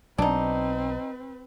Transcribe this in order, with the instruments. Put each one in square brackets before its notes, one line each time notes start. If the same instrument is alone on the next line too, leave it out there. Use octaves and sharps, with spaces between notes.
[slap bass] B1 F#3 [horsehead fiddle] C4 B4 [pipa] D4 D#4